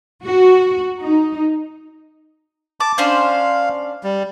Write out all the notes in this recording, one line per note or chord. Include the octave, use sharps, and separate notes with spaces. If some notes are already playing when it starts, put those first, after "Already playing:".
F#4
D#4
A5 D6
C#4 D4 C5 F5
G3